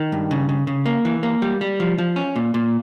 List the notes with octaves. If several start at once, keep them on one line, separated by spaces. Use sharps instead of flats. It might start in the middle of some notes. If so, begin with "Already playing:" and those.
Already playing: D#3
G2
C#3
C#3
C#3
A#3
E3
A#3
G3
G3
F3
F3
C#4
A#2
A#2